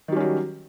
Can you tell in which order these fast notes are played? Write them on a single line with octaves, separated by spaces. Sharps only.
D#3 G3 C#4 F#3